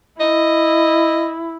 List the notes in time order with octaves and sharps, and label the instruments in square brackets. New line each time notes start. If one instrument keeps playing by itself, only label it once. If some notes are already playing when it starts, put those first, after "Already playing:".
[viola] E4 [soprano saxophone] D#5